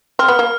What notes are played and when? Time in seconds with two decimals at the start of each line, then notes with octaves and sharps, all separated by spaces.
0.19 C4 F6
0.28 B3
0.39 A#3